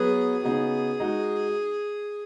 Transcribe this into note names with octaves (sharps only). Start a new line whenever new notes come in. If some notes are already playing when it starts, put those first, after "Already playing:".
Already playing: F#3 B3 F#4 G#4 B4
C#3 B3 D#4 F#4 G#4
G#3 D#4 F#4